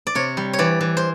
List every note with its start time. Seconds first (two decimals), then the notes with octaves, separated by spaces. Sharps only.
0.07 D5
0.15 C3 C#5
0.37 G3
0.53 C#5
0.59 E3 D5
0.81 E3
0.97 C5